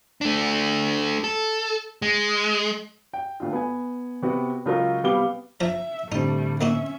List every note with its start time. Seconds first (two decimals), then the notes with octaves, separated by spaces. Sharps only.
0.21 A3 D4
1.24 A4
2.02 G#3
3.13 G5
3.40 D2 G2 F4
3.53 B3 G#5
4.22 C3 B3 F#4
4.66 C#2 F#3 F4 F#4 A#4
5.03 C3 G3 B3 F5 D6 G7
5.60 F3 E5 A#5
6.12 A2 D3 G3 A3 C4 D#4
6.61 A#3 C#4 D#4 F#4 E5